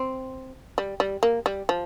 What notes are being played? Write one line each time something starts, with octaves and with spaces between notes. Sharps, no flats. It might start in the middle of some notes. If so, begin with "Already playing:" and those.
Already playing: C4
G3
G3
A#3
G3
F3